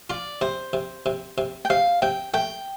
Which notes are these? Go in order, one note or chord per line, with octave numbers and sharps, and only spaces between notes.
F4 D5
C3 C5
C3
C3
C3
G5
C3 F5
C3 G5
A3 G5